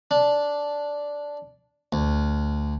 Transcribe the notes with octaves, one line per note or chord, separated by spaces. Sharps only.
D4
D2